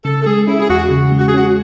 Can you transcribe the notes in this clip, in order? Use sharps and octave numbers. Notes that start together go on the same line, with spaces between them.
C#3 A4
A4
G#3 G#4
C#4 E4
G#4
E2 F#4
C#3
G#3
F#4
G#4
C#4 F#4